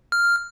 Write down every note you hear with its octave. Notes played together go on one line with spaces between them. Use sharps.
F6